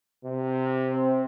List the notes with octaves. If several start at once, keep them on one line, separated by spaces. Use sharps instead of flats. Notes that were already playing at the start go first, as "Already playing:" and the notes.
C3
C4